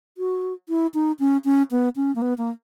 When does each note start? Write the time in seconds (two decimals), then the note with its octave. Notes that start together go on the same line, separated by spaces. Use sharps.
0.18 F#4
0.69 E4
0.94 D#4
1.20 C#4
1.45 C#4
1.71 B3
1.96 C#4
2.16 A#3
2.22 B3
2.38 A#3